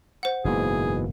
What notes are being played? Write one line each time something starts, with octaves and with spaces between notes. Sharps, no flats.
C5 F#5
F#1 G#2 B2 E3 A#3 G#4